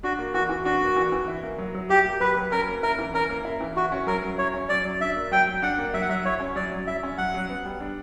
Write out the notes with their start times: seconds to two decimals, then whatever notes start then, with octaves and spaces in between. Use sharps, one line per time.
0.03 D4 F#4
0.19 A#3
0.34 E3 F#4
0.49 E3
0.65 D4 F#4
0.81 A#3
0.96 E3
1.12 E3
1.28 E4
1.43 A#3
1.58 F#3
1.75 F#3
1.90 E4 G4
2.05 A#3
2.20 F#3 B4
2.37 F#3
2.52 C#4 A#4
2.68 A#3
2.83 E4 A#4
2.99 E3
3.14 C#4 A#4
3.29 A#3
3.45 E4
3.61 E3
3.76 E4 F#4
3.92 C#4
4.07 F#3 A#4
4.23 F#3
4.38 E4 C#5
4.54 C#4
4.69 F#3 D5
4.85 F#3
5.00 D4 E5
5.16 A#3
5.31 F#3 G5
5.47 F#3
5.62 D4 F#5
5.78 A#3
5.94 F#3 E5
6.01 F#5
6.09 F#3 E5
6.25 E4 C#5
6.40 C#4
6.56 F#3 D5
6.72 F#3
6.87 E4 E5
7.03 C#4
7.18 F#3 F#5
7.34 F#3
7.49 B3
7.65 G3
7.81 D4